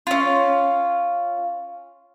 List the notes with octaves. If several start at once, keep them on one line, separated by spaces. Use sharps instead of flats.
C#4 F4